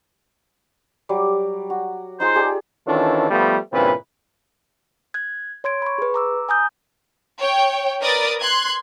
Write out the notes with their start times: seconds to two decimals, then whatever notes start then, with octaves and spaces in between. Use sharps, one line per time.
1.09 F#3 G3 D6
1.70 F#4
2.20 D#4 F4 G#4 C5
2.35 G4 G#4 D5
2.87 D#3 E3 C#4 D4 F4 A4
3.30 F3 G3 A3 B3
3.72 G2 A#2 C#3 E3 C4 B4
5.14 F#6 G#6
5.64 C#5 C6 G#6 D7
5.82 B5 C#6
5.98 G#4 B4
6.14 A#5 D6 E6
6.49 G#5 A#5 D#6 G6
7.39 C#5 G5
8.01 A#4 B4 D5 D#6 A6
8.40 C6 F#6 G#6